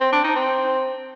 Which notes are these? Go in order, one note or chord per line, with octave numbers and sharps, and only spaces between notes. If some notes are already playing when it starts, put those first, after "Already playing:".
C4
D4
D#4
C4